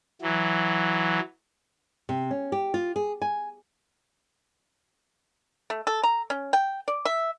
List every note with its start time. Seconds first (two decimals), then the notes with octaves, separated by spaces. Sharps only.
0.22 E3 F#3
2.09 C3
2.31 C#4
2.52 G4
2.74 F4
2.96 G#4
3.22 G#5
5.70 A3
5.87 A4
6.03 A#5
6.30 C#4
6.53 G5
6.88 D5
7.05 E5